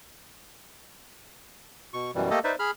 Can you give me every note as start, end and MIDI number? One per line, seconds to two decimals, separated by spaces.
1.94 2.11 47
1.94 2.11 85
2.15 2.30 42
2.15 2.30 47
2.15 2.30 52
2.15 2.30 55
2.31 2.39 57
2.31 2.39 58
2.31 2.39 67
2.31 2.39 69
2.31 2.39 75
2.44 2.55 63
2.44 2.55 71
2.44 2.55 72
2.44 2.55 74
2.44 2.55 76
2.59 2.71 68
2.59 2.71 83
2.59 2.71 89